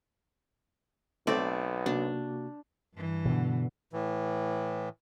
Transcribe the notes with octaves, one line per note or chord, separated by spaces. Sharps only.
B1 A3 C4 D5
C3 A#3 D4 F#4
G2 E3
B2 D3
A2 E3